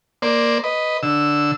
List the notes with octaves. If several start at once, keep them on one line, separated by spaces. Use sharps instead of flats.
A#3 C5 D5
B4 D#5
D3 E6